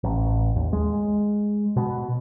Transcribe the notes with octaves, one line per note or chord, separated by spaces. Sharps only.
A1
D#2
G#3
B2